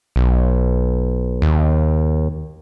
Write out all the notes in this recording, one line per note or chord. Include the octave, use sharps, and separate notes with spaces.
B1
D#2